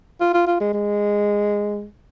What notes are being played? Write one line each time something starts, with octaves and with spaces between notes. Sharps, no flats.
F4
F4
F4
G#3
G#3